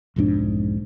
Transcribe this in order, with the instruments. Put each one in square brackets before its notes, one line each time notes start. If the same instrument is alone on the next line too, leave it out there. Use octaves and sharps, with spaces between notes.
[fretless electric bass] B1 F2 G#2 D4